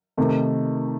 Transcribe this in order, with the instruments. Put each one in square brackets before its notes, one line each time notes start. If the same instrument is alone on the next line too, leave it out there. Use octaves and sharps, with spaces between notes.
[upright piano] C3 D#3 A3 D#4